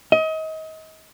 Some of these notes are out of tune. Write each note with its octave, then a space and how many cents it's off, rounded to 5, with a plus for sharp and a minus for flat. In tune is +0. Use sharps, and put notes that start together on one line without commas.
D#5 +30